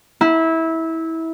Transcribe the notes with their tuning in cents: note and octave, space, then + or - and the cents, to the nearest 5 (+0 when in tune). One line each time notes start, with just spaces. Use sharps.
E4 -20